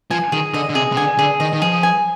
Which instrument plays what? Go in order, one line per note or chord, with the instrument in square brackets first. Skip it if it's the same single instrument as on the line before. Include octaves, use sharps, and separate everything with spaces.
[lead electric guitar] F3 [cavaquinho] G#5
[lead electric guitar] D#3 [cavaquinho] G#4
[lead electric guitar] D3 [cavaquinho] D#5
[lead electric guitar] D3
[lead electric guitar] C3 [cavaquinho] G#4
[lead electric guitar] C3
[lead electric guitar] D3 [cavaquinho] G#5
[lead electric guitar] D3 [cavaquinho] G#4
[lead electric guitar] D#3 [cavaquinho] D#5
[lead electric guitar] D#3
[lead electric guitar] F3 [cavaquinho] G#4
[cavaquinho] G#5